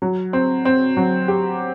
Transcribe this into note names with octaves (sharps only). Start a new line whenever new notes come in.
F#3
C4
C4
F#3
G4